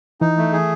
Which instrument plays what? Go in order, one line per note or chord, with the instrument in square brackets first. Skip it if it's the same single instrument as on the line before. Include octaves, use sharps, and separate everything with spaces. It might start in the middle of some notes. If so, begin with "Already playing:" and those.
[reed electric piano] E3 [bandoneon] D#4
[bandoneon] A3
G#4